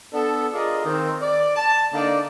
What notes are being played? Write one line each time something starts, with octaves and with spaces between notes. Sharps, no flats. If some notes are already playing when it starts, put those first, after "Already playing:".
B3 D4 A4
F4 G#4 A#4 D5 D#5
D#3 C4
D5
A5
D3 A#3 D#4 D5